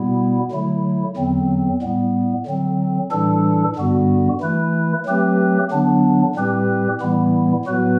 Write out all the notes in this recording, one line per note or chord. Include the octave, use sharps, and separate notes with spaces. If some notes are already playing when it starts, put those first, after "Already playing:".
Already playing: B2 G3 B3 E4
D3 F#3 A3 E4
E2 D3 F#3 C4
A2 G3 B3
D3 F#3 C4
A2 E3 G3 D4 A4
G2 D3 G3 B3 F#4
E3 A3 E4 B4
F#3 A3 C4 G4 B4
D3 F#3 B3 D4
A2 G3 C4 G4 B4
A2 E3 G3 B3 E4
A2 F#3 B3 F#4 B4